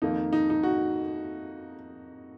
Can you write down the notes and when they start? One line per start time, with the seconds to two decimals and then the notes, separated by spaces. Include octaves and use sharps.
0.02 F2 D#3 A#3 D#4
0.33 D#4
0.50 D#4
0.63 F#4